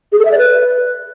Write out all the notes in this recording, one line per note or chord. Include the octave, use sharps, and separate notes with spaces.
G#4
A4
E5
D5
B4